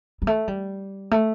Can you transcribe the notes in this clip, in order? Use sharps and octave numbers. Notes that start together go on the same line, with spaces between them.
G3
A3
G3
A3